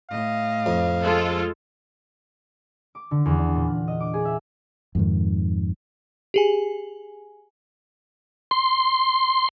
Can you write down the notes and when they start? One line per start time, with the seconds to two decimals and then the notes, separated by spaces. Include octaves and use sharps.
0.11 A2 D#5 F5
0.66 F2
1.03 G#3 F4 A4
2.95 D6
3.11 D3
3.26 E2
3.39 D4
3.55 A#2
3.67 F#6
3.88 D#5
4.00 D6
4.14 G#4
4.25 E5
4.95 F2 G#2 D#3
6.34 G4 G#4 G#5
8.51 C6